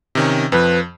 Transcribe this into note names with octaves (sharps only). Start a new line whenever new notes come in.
C3 D#3 C#4
F2 F3 B4